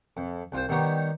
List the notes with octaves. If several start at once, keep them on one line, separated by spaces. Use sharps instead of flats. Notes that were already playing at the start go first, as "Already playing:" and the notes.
F2
C2 F4 C5
D#3 G3 B3 D#4 G4 C#5